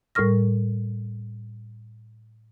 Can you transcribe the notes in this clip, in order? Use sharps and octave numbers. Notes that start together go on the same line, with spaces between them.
A2 G3 A#4 C#6 F6 A#6